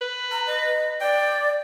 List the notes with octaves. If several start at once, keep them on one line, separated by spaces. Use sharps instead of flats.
B4
A#5
D#5
D5 G5